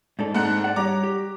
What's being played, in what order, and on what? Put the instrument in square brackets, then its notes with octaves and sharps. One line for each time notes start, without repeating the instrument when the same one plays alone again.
[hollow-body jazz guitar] G#2 D4 A4
[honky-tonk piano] G#2 F#5 F#6 [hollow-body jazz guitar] C4 D4 A4
[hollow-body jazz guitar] D5 F#5
[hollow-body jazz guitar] G3 G4 C#5 [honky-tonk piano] A#5 D6
[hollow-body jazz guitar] G4